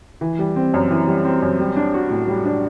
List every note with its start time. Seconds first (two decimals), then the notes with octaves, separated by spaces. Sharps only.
0.21 E3
0.39 G3
0.56 C4
0.74 F#2
0.91 E3
1.07 G3
1.25 C4
1.42 F#2
1.59 G3
1.77 D4
1.94 F#4
2.10 A2
2.28 G3
2.45 D4